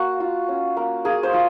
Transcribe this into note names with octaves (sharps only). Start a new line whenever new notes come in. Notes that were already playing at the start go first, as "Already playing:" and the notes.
Already playing: A#3 F#4
F4
C#4
A#3
A#3 G#4
C5
F4